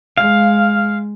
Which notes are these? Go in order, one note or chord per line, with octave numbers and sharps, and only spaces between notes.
G#3 F5